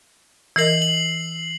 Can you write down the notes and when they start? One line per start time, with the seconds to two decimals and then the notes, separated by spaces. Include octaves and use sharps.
0.56 E3 A#4 D#5 E6 C7 F#7
0.82 F#7